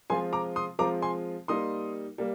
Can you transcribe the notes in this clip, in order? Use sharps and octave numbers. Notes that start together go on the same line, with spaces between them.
F3 G#3 C4 F4 G#5 C6
A#5 D6
C6 D#6
F3 G#3 C4 F4 A#5 D6
G#5 C6
G3 A#3 D#4 C6 D#6
G3 A#3